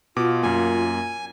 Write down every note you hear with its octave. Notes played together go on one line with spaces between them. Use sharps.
B2 F4 D6
F#2 A#3 G#5